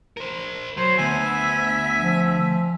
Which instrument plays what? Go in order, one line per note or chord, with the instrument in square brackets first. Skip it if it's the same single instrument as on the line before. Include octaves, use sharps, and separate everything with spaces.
[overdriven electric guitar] A#4 C5
[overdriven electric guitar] F#3 [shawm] C5
[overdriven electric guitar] D2 [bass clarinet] B3 [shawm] E5 [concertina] G#5
[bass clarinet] F3